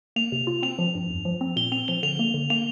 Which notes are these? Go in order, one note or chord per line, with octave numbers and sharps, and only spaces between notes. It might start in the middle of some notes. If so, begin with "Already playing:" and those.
A#3 F7
C3
F4
C4 F7
F3
G2
F2
F3
C4
A#2 G7
C4 F7
F3 G7
D3 F7
A#3
D3
A#3 F7